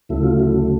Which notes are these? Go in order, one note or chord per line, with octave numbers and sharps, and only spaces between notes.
D2 C#3 F#3 A3 E4
F4
E4